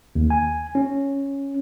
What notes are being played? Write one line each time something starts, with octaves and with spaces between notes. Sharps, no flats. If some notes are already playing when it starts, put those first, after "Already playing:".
D#2
G#5
C#4